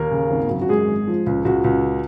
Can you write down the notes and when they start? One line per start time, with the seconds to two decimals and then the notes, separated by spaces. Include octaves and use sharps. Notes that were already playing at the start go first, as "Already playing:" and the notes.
Already playing: D#2 A#3 A#4
0.11 C#3
0.31 G#1
0.50 F#2
0.61 F#4
0.69 F#2 G#3 G#4
0.87 G#1
1.07 F3
1.26 C#2
1.45 C#2 F#4
1.64 C#2